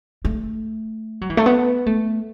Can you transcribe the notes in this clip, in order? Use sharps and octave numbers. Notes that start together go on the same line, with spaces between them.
A3
F#3
E3
A3
B3
A3